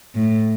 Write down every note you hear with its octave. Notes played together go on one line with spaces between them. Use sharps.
A2